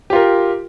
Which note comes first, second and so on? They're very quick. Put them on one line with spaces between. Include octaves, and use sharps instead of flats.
G4 F4 A#4